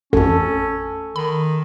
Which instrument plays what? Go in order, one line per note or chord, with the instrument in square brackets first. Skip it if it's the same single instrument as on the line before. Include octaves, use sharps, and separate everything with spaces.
[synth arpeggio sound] A1 F2 [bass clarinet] C#4 [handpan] A4
[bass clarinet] D#3 [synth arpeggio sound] B5